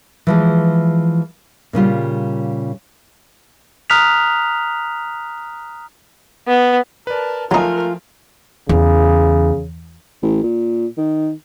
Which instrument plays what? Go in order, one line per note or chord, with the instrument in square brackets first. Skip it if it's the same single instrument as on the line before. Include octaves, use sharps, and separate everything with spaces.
[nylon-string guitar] E3 F3 G#3
A#2 C#3 G3 F4
[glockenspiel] A#5 D#6 F6 F#6 B6 F7
[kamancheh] B3
[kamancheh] A#4 A5 [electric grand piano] B4 D5
[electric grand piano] F3 [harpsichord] F#3 D#4 [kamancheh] A3 A#4 [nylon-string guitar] F4 G#5
[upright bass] E2 [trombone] C#3
[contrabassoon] A1
A#2
D#3